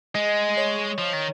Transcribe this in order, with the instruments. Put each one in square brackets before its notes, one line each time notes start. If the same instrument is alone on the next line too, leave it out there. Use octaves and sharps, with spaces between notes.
[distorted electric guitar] G#3 [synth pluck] D#5
[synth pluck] C#5
[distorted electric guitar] F3
D#3